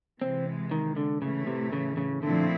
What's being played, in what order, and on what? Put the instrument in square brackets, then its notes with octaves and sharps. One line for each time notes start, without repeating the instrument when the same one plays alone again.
[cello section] C3 E3 G#3 [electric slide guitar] C4
[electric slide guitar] D#3
D3
[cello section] A2 E3 A3 [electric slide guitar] C#3
[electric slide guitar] C3
C#3
C#3
[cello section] A#2 F3 A3 C4 E4 [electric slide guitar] D3